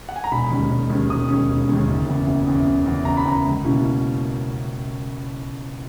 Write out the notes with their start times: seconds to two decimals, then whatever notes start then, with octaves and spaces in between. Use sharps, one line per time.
0.09 F#5
0.16 G#5
0.24 A#5
0.32 E1 B5
0.50 D#2 D#3 G#3 C#4
0.70 E1
0.90 D#2 D#3 G#3 C#4
1.10 E1 D#6
1.29 D#2 D#3 G#3 C#4
1.49 E1
1.69 D#2 D#3 G#3 C#4
1.88 F#1
2.07 E2 C#3
2.27 F#1
2.47 E2 C#3
2.67 F#1
2.86 E2 C#3
3.05 F#1 A#5
3.17 B5
3.25 E2 C#3 A#5
3.45 C#2
3.64 B2 A#3 C#4 E4